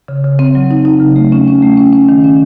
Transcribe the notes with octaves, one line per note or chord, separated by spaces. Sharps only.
C#3
C#3
C4
F#3
D#4
D#4
C#3
A3
C#4
C#4
A3
C#4
C#4
D#3
C#4